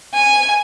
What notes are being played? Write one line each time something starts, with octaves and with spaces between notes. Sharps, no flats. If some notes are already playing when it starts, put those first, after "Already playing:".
G#5